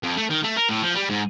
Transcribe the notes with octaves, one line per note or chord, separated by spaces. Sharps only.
F2
A3
D#3
A3
A#4
A2
F3
G3
G#2